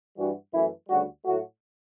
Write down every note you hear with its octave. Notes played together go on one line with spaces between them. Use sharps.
G2 E3 G3 F#4
F#2 E3 A3 E4
D2 C#3 G3 F#4
A2 F#3 A3 F#4